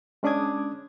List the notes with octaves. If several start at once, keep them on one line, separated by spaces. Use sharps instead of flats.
G#3 C#4 D4 D6 D#6 G#6